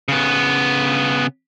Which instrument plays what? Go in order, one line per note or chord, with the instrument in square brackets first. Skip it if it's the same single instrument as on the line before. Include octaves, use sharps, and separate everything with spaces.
[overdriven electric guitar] C#3 B3